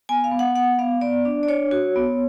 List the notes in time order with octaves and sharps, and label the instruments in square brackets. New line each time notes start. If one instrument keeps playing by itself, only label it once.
[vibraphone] B3 G#5
F5
B3
F#5
B3 F#5
B3 F5
B3 D5
D4
D5
D4 C#5
F#4
B3